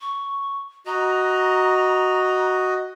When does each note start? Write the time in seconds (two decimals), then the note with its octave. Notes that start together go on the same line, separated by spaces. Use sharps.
0.01 C#6
0.86 F#4 D#5 A#5